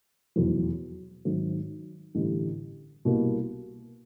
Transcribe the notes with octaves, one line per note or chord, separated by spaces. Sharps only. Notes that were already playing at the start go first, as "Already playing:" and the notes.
F1 E2 B2 F#3
G#1 G#2 D#3 F#3
A1 G2 D3 G3
C2 B2 G3 A#3